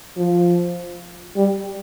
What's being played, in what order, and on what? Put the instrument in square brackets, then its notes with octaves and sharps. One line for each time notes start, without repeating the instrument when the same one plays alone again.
[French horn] F3
G3